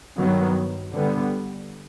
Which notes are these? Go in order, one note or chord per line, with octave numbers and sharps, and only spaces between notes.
G2 D#3 F#3 B3
D3 G3 B3